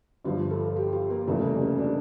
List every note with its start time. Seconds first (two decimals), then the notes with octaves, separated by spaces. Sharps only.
0.24 G1 G2 F3 F4
0.50 A4
0.76 G4
0.93 F4
1.10 A#3
1.27 F1 E2 C#3 G3 A3
1.44 A#3
1.61 C#4
1.78 D4